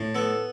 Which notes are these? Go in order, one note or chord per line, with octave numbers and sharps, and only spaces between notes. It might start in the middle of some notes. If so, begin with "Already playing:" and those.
Already playing: A2
B3 A4